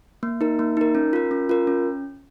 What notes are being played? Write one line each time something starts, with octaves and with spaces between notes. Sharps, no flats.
A#3
D#4 A#4
A#3
D#4 A#4
C#4
F4 A#4
C#4
F4 A#4
C#4